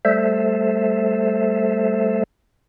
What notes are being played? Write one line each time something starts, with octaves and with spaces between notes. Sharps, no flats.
G3 A3 A4 C5 E5